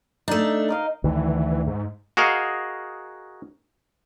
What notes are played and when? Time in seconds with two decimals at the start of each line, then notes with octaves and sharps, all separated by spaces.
0.28 A3 D4 D#4
0.68 A#4 D#5 F5
1.04 D2 D#3 E3
1.67 G#2
2.17 F#4 G#4 A#4 D#5 F5 F#5